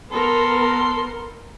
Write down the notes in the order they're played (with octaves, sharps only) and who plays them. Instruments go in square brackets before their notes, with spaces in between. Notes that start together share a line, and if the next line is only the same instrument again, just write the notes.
[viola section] B3 A#4 [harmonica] A4 C6